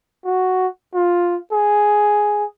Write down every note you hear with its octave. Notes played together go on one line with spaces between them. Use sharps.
F#4
F4
G#4